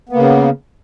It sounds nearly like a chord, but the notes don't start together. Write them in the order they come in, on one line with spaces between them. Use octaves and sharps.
B3 A#3 C#3